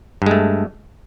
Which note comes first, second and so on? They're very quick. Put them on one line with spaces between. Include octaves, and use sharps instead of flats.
G2 G#3 A3